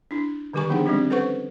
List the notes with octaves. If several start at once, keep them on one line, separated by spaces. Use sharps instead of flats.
D4 E4
D3 D#3 G3 G4 G#5 C#6
F3 B3 D4 D#4 G#4 F#5
G3 G#3 C4 D4 G4
C#4 A4 B4 C5 F#5 C#6